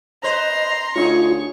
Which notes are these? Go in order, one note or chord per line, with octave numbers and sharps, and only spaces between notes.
B4 C5 D#5 A#5 C6
D2 C#4 D#4 F4 G#4 C#6